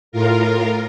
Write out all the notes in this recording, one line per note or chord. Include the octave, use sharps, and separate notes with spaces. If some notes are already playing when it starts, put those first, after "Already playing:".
A2 F4 A#4